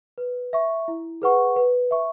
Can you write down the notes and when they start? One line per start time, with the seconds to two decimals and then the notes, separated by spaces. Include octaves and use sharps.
0.18 B4
0.53 E5 C#6
0.88 E4
1.22 G#4 B4 F#5 C#6
1.56 B4
1.91 E5 C#6